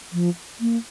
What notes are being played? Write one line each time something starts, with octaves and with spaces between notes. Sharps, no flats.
F3
A#3